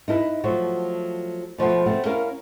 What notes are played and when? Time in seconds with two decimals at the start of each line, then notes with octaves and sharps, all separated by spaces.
0.08 D#4 E4 A4 B4
0.44 F3 F#3 A3 F#4
1.58 B2 F3 A3 B3
1.86 A3 B3 C4
2.05 C#4 E4 A#4 F5